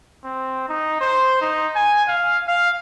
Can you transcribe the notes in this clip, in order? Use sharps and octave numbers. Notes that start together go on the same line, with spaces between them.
C4
D#4
C5
D#4
G#5
F5
F5